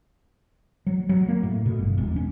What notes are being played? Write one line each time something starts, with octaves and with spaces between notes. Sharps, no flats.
F#3
F#3
A#3
A2
B2
G1
E1
C#4